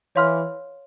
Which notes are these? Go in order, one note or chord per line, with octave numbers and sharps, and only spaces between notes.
E3 C#5 F5 C6 F6